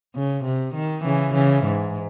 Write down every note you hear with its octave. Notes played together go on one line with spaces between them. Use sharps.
C#3
C3
D#3
C#3 E3
C#3 E3
G#2